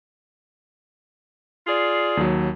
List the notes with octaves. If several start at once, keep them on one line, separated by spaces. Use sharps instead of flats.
F4 G#4 D5
D#2 F#3